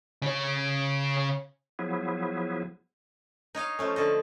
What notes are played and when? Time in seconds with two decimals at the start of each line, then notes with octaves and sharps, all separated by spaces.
0.22 C#3 C#5
1.79 F3 F#3 B3 E4 G#4
3.55 D#4 C#5 D#5 F5
3.79 F3 A3 C#4
3.96 D3 A4 D#5